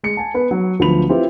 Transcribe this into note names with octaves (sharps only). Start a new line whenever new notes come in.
G#3 C#7
G#5 A5
B3 B4
F#3
D2 F3 F#3 B3 B5 F7
C4 E4 F4 G4 B4